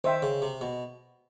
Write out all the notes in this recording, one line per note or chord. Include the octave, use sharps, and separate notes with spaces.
D#3 C5 E5 G5
C#3
C3
B2